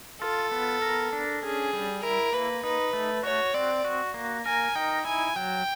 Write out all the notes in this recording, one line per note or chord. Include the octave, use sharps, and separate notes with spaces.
F4 A4
B3
A#4
D4
C#4 G#4
G3
E4 A#4
A#3 B4
D#4 B4
A3
F#4 C#5
C4 D5
F#4
A#3
A#4 G#5
D#4 G5
E4 G#5
F#3 G5